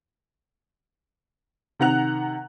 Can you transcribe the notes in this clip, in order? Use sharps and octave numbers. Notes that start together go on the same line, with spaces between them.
C3 D#3 F#5 A#5 F#6 F7